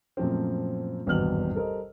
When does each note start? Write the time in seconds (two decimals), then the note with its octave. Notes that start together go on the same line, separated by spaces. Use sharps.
0.17 F#2 A#2 F3 A3 C4
1.06 G#1 E2 G2 B2 F6 F#7
1.55 G3 A4 A#4 C5 D#5